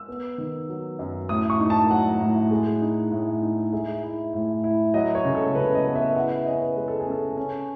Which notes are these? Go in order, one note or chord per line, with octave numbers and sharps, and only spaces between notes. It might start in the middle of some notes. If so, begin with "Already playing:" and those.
Already playing: E6
B3
D#3
F#3
F#2
A2 D#6
C#6
D#4
A5
F#3 F#5
A2
G#3
D#4
A2
D#4
G#3 E5
E4
A2
E4
F#3 D#5
C#5
C#3
A4
C#3 B4
D#5
B3
E5
E4 F#5
E5
C#4 D#5
B4
G#3 B4
A4
G#4
C#4
A4
C#4